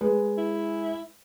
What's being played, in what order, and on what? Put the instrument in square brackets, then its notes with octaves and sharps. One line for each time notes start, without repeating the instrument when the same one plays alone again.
[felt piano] G#3 B4
[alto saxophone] E4